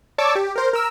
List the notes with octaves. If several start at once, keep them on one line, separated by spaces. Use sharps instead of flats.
C#5 D5 A5 C#6 D6 E6
G4
A#4 C5
A#4 E6